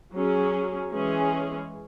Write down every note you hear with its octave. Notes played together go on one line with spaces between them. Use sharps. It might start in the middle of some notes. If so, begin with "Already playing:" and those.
F#3 C#4 G#4
E3 G#3 C#4 G#4